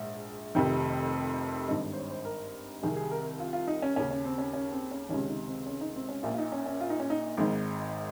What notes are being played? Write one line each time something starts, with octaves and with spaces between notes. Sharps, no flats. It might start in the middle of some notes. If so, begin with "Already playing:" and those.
Already playing: A#1 G#2
F1 F2 C3 D#3 G5
G#1 G2 D#3 D#5
C5
C#5
C5
A#4
C2 C3 D#3 G#4
G#4
A#4
F4
F4
D#4
C#4
D#2 C#3 C#4
C#4
C4
C#4
C#4
C4
C#4
C#2 C3 D#3 C#4
D#4
C4
C#4
D#4
C4
C#4
A#1 A#2 F4
F4
D#4
C#4
C#4
F4
D#4
C#4
D#4
G#1 G#2 D#3